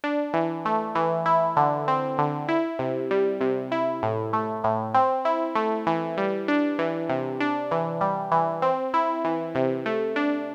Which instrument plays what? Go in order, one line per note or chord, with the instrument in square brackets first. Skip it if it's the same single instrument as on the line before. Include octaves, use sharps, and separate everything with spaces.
[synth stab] D4
E3
A3
E3
E4
D3
C4
D3
E4
C3
G3
C3
E4
A2
A3
A2
C4
E4
A3
E3
G3
D4
E3
C3
D4
E3
G3
E3
C4
E4
E3
C3
A3
D4